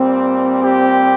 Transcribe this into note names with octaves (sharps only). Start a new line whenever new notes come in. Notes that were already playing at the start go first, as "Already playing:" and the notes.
Already playing: A#2 G3 C4
G4